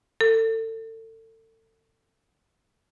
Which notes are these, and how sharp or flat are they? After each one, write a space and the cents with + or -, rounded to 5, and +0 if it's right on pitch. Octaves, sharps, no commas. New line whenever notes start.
A4 +30